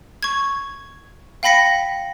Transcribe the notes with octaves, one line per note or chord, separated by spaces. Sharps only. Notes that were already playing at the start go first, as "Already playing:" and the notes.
C#6 G#6
F5 G5 B5 A#6 B6 C#7